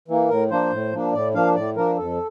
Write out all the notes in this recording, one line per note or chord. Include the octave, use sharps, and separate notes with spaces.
E3 A#3
A2 A#4
F3 A#3 D4 C5
A2
F3 A#3 D4
A2 D5
F3 A#3 D4 F5
A2 D5
F3 A#3 D4 A#4
F2 A4